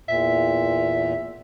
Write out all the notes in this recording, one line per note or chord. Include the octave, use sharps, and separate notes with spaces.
E2 A#2 E5